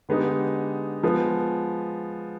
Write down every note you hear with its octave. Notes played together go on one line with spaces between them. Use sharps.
D3 G#3 B3 D#4 G4
F3 G#3 B3